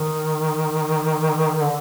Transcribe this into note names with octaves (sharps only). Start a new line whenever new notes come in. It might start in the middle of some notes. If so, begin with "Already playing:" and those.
Already playing: D#3
D3